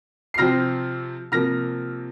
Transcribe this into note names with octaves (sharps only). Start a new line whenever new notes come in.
C7
C3 F3 C4 F6 A#6
C3 F3 A#3 F6 A#6